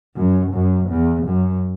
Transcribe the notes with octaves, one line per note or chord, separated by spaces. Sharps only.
F#2
F#2
E2
F#2